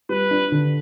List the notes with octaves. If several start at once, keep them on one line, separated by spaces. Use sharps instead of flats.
G3 B4
D4
D3